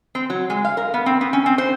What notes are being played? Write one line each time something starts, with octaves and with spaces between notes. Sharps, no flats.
C4
F#3
G#3
F5
A#4
B3
C4
B3
C#4
C4
C5